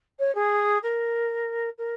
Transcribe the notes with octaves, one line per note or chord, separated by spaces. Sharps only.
C#5
G#4
A#4
A#4